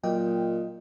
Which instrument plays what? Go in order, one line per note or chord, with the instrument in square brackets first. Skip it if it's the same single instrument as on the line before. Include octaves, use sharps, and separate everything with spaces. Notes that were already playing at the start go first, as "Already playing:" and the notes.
[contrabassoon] A#2 [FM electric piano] F#3 D#5 G5